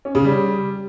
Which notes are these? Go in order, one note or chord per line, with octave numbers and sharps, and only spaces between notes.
C#4
C#3
G3